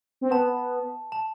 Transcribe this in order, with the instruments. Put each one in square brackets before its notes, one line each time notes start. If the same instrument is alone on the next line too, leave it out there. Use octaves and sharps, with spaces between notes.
[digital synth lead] C4
[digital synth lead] B3 [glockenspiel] A5
[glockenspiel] A5